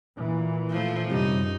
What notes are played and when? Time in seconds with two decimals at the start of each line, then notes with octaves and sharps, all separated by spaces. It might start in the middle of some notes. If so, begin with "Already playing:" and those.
0.17 A#2 E3
0.70 F3 A3
1.10 F#2 C3 G3 D#4